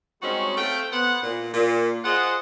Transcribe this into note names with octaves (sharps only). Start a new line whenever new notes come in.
G3 G#3 C4 C#4 D#4 F#4
A3 C4 F5 G5
B3 C5 F#5
A#2
A#2
F4 G#4 C5 D#5 F#5